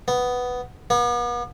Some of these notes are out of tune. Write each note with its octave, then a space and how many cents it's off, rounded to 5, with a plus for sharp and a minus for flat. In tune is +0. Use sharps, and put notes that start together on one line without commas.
B3 +5
B3 -40